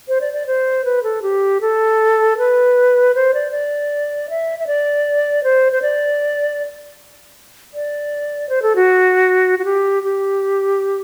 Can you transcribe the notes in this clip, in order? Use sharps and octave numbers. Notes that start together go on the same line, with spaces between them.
C5
D5
D5
C5
B4
A4
G4
A4
B4
C5
D5
D5
E5
E5
D5
C5
C5
D5
D5
C5
A4
F#4
F#4
G4
G4